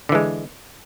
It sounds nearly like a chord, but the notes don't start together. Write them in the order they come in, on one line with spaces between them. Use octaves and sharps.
D3 E3 G#3